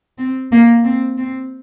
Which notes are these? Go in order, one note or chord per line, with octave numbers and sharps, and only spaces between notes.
C4
A#3
C4
C4